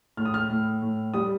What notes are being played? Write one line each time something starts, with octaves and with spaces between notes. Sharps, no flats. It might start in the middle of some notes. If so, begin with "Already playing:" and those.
A2 F6
D#6
F6
A2
A2
G3 D#6